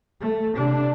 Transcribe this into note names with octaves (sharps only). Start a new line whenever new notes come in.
A3
C3 D4